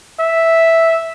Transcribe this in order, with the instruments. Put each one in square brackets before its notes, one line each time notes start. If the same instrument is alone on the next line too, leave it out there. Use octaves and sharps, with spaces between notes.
[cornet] E5